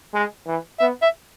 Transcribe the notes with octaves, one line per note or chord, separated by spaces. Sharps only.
G#3
E3
B3 E5
E5